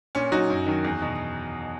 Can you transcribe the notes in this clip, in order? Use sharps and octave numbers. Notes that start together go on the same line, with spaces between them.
A#2 C#4
F#3 D#4 F#4
F#2
D#3 F#3
E2
B2